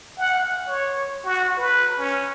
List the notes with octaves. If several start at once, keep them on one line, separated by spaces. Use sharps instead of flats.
F#5
C#5
F#4
B4
C#4